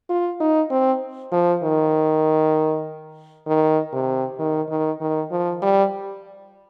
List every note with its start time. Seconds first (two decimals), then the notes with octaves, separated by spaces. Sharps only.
0.09 F4
0.40 D#4
0.70 C4
1.32 F3
1.63 D#3
3.47 D#3
3.93 C3
4.39 D#3
4.69 D#3
5.01 D#3
5.31 F3
5.62 G3